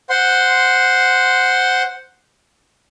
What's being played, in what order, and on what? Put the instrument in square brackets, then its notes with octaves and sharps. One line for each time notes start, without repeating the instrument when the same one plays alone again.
[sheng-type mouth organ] C5 F#5 C6